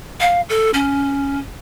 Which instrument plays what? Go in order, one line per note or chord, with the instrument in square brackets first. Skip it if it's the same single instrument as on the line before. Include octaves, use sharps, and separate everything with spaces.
[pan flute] F5
A4
C#4